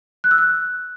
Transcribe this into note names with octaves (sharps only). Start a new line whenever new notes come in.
F#6
E6
F#6